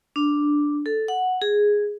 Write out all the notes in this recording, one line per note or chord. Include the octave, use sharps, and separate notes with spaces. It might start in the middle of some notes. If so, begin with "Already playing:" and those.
D4
A4
F#5
G#4